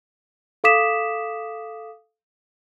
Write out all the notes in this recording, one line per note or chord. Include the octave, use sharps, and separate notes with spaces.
A4 F5 D6 D#6 B6 E7